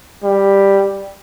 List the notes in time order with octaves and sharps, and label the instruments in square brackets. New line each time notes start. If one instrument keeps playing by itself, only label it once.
[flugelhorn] G3